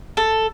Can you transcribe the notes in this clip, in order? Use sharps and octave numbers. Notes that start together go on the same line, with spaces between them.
A4